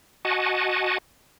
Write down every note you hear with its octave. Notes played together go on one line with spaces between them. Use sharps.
F#4 D#5 F#5 G#5 A5